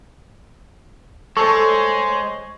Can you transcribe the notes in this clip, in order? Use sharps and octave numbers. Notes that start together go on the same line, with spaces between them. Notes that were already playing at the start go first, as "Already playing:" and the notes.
G#3 A4 C5 C#5 C#6